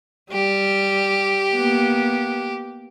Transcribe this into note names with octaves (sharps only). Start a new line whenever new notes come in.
G3 G4
A#3 B3